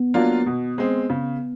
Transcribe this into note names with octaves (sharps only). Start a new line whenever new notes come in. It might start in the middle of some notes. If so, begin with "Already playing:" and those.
Already playing: B3
F#3 A#3 D4 F4
B2
G#3 C4
C#3